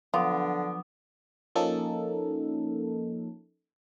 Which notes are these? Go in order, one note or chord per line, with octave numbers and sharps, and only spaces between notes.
D3 F3 F#3 B3 D4 F4 D6
F3 A#3 C#4 D#4 A4